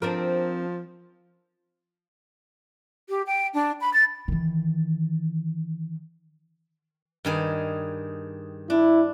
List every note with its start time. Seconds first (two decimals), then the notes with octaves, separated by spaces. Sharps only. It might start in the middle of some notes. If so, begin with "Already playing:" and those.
0.02 F3 C4 D4 A#4
3.09 G4
3.26 G5
3.54 D4
3.80 B5
3.93 A6
4.28 D#3 E3
7.25 G2 D#3 G#4
8.70 D4 E4